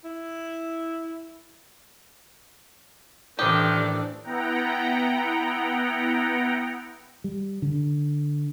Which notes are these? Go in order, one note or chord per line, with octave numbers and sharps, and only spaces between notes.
E4
A1 D#3 D4 G4 A4 C5 D#6
B3 E4 F#5 G5 A#5
G3
D3